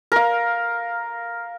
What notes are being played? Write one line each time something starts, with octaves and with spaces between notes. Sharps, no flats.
A#4 F5